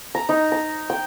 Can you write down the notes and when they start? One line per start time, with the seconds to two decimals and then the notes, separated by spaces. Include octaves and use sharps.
0.15 A#5
0.29 D#4
0.52 A#5
0.90 G5